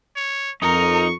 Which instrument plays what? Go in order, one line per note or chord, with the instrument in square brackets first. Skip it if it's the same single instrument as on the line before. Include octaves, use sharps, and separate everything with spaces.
[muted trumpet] C#5
[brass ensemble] F2 [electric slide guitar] D#4 [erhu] A#4 [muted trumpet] C#6